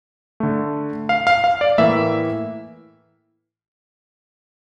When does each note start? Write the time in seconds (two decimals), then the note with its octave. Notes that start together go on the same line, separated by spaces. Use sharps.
0.40 D3 A3
1.09 F5
1.27 F5
1.44 F5
1.61 D5
1.78 A2 E3 A#3 E5